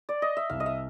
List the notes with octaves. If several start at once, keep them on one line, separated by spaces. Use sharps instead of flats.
D5
D#5
E5
C2 F5
D#5
E5